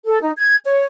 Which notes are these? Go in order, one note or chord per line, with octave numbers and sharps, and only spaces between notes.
A4
D#4
G#6
C#5